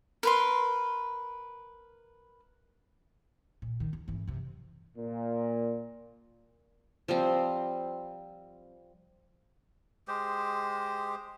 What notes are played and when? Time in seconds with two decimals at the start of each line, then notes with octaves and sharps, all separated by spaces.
0.23 A#4 B4 C6
3.62 A#2
3.80 D#3
3.93 D#2
4.08 G#1 E3
4.28 F#2 C3
4.97 A#2
7.08 F3 G3 C4
10.08 G#3 G4 C5